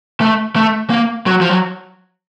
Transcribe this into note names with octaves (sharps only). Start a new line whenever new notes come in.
A3
A3
A#3
F#3
F3
F#3